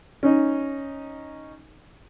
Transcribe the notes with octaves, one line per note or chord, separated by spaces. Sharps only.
C#4 D#4